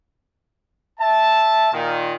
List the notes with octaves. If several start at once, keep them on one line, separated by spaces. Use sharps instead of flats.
E5 A5
A#2 D#3